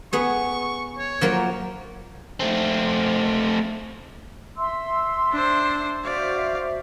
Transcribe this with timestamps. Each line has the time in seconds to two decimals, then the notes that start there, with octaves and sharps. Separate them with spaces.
0.13 B3 G#4 C#6
0.98 C#5
1.21 F3 F#3 A#3
2.40 A3 C4
4.57 E5 C6 E6
5.33 D4 C5
6.05 F#4 C5 D5 E5 F5